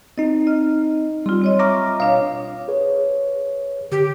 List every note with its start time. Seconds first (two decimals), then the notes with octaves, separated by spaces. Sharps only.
0.18 C4 D#4 D#5
0.47 D#5 F6
1.26 G3 C4 F4
1.42 C4 C#5 D#5
1.59 E5 A#5 C#6 D6 F6 A#6
2.00 B2 D4 C#5 F5
2.68 G#4 B4 C#5
3.92 D3 G4